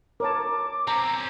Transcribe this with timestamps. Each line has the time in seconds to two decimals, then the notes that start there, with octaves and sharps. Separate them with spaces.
0.20 A#4 C#5 A5 D6
0.87 C4 C#4 A#5